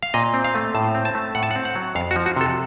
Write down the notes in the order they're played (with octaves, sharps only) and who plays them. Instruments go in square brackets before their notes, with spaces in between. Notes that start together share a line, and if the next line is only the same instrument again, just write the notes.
[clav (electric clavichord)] F5
A#2 D#5
C4
F5
A3
A2 A5
C4
A5
A3
A2 F#5
A5
F#5
C4
F#5
F#3
F2 F5
F#4
F3
F#4
C3 A4